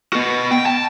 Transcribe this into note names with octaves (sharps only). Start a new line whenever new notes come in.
B3 F#4
G5
A5